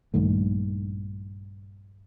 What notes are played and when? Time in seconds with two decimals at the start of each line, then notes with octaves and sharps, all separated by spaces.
0.14 A#1 G2 D#3 A3